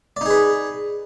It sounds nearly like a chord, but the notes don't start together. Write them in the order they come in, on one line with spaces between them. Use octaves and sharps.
D5 D#4 G#4 B4